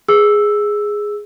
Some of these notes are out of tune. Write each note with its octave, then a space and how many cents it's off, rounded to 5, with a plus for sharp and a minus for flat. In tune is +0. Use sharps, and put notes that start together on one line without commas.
G#4 +0 E6 +0